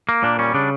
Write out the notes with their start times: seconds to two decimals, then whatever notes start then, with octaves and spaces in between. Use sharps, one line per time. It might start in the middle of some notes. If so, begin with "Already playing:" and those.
0.09 A#3
0.23 A#2 D4
0.39 G3 C#4
0.54 C#3 D4